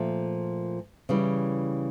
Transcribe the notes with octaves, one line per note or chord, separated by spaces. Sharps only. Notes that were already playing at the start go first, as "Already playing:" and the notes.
Already playing: A#2 F3 A3
C#3 E3 G3